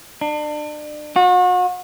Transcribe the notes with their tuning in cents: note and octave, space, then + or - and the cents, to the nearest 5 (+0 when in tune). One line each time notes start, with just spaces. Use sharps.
D4 +35
F#4 -40